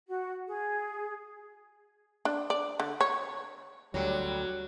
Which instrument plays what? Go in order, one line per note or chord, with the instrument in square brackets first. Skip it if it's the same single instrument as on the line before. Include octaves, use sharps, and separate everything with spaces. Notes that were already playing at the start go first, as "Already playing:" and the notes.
[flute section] F#4
G#4
[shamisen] D4
D5
D3
C#5
[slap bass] D2 D3 [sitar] F#3 [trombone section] G3